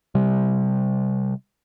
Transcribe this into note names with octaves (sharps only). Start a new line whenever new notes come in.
C3 G3